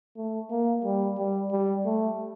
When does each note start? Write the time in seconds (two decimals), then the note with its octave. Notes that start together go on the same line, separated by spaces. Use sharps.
0.17 A3
0.50 A#3
0.84 G3
1.18 G3
1.51 G3
1.85 A3